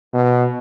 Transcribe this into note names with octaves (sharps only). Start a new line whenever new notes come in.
B2